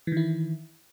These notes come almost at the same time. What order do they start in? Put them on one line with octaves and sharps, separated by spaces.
E3 D#3 E4